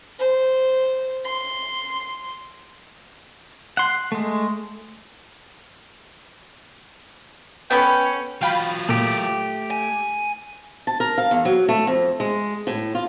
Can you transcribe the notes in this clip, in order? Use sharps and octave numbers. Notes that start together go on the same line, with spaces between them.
C5
C6
F#5 C6
G#3 A3
B3 C#4 A4 B4 G5
F#3 F4 F5 G5 B5
A#2 A3 G4
G#5
A5
A#4
F5
E2
F#3
A3
F2
G#3
A2
F4